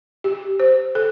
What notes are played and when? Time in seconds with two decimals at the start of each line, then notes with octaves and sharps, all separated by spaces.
0.24 G4
0.60 C5
0.95 A4